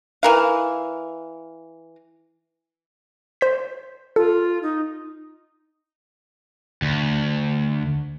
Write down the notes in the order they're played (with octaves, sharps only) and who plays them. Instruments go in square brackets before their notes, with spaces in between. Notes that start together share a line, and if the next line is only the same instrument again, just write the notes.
[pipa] E3 A#4 F5
[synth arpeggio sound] C5 G6 B6
[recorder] F4 [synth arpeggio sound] A4
[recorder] D#4
[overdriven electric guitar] D2